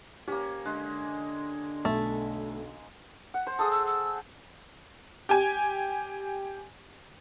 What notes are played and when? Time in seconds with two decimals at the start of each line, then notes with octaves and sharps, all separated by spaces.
0.28 A#3 C#4 G4
0.65 D3 G#3
1.85 B1 A3
3.34 F#5
3.47 C5
3.59 G#4 A4 D#6
3.71 E6
3.86 E6
5.29 G4 G#5